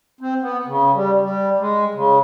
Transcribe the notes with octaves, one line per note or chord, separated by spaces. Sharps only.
C4
B3
C#3
G3
G3
G#3
C#3